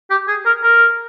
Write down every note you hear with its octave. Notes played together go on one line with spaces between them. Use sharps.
G4
G#4
A#4
A#4